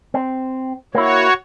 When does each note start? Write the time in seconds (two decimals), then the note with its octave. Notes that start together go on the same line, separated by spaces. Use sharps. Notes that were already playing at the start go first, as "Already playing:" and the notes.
0.14 C4
0.95 A#3 E4 F#4 C#5